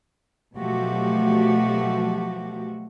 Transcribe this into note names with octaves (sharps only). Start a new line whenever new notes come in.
B2 F3 F#3 A3 F#4 G4